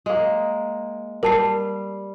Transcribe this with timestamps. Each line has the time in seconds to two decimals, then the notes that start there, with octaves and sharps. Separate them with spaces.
0.06 G#3 A#3
1.23 G3 A#4 A5 C7